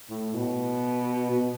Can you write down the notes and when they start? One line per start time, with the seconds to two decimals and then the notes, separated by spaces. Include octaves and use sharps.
0.10 A2
0.34 B2
1.30 B2